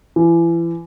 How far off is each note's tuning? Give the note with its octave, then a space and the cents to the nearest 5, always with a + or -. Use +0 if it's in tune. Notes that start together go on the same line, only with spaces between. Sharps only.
E3 +30